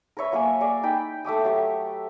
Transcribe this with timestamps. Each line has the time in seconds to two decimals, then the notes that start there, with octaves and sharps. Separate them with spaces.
0.17 A#4 B4 C#5 E5
0.32 F#3 A#3 C#5 G#5
0.61 G#4 A#4 D5
0.83 D#4 G5 B5
1.25 A3 E5 D6 D#6
1.45 F#3 G4